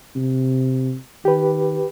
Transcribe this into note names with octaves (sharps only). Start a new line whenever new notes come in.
C3
D#3 G4 B4